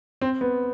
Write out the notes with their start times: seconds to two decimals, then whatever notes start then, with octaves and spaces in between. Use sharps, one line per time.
0.21 C4
0.41 B3